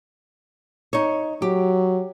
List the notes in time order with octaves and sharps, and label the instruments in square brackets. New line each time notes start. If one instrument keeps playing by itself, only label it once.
[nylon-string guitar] D#4 C#5
[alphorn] F#3 [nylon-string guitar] G4